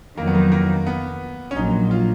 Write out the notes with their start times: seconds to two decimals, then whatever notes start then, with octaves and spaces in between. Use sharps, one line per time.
0.17 F2 D#3 F#3 A#3
0.27 B3
0.35 A#3
0.52 A#3
0.86 B3
1.51 C#4
1.56 A#1 A#2 F#3 D#4
1.91 F4